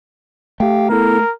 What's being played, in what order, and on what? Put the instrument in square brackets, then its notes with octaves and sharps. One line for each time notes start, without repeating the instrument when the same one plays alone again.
[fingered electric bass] A3 [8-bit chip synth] G4 F5 G5
[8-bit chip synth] B3 E4 A4 [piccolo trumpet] A#4